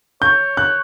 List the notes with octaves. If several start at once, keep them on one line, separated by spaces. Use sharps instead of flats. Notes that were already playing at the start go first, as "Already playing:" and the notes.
C#5 G6
F#6